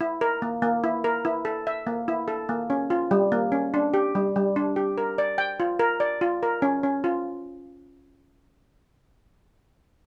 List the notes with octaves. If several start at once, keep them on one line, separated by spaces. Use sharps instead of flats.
E4
A#4
A#3
A#3
E4
A#4
E4
A4
E5
A#3
E4
A4
A#3
C#4
F4
G3
A#3
C#4
D4
G4
G3
G3
D4
G4
A#4
D5
G5
F4
A#4
D5
F4
A#4
C#4
C#4
F4